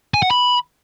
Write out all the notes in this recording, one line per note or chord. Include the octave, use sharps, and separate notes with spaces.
G#5
F#5
B5